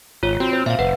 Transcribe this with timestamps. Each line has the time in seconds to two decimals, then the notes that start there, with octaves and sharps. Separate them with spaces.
0.23 G#1 F4 C#5
0.40 C4 F#4
0.53 C5
0.66 A#2 E5 F5
0.79 F#1 B4 F#5